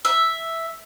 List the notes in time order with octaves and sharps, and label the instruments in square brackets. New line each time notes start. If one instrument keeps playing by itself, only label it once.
[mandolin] E5